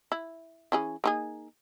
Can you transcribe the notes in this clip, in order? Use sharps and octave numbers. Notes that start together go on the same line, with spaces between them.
E4
E3 C#4 G#4
A#3 D#4 G#4